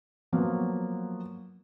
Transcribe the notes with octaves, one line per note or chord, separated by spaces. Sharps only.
F3 F#3 A#3 B3